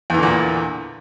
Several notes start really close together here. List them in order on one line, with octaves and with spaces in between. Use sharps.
E2 E3 D3 A#2